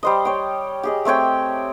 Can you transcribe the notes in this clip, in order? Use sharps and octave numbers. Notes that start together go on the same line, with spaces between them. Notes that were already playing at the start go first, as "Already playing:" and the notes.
G3 C5 D#5
C#5 G5
G4 G#4 D#5
A3 C4 C#5 G5